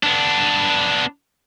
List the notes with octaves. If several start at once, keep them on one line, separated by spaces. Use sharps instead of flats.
B3 D4